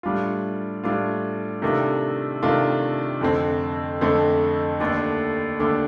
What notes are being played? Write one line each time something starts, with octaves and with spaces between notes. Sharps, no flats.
A2 G3 D4 F4
A2 G3 D4 F4
C3 D#3 A3 D4 F4
C3 D#3 A3 D4 F4
F2 D3 A3 C4
F2 D3 A3 C4
D#2 D3 A3 D4
D#2 D3 A3 D4